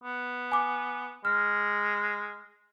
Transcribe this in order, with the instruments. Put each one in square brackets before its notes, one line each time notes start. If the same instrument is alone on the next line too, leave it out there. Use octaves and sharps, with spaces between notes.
[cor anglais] B3
[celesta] G#5 D6
[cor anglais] G#3 [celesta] F6